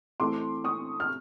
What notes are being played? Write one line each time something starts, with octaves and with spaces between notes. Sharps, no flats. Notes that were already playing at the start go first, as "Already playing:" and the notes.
E3 A3 C4 C6 D6
C#6 D#6
F6